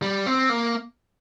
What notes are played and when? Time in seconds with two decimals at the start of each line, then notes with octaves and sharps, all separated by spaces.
0.02 G3
0.26 C4
0.49 A#3